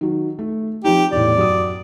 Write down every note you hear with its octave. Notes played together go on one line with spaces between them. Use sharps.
D#3 F#3
A3
F3 C4 D#4 G4
E2 A2 D5
F#2 F#4 D#6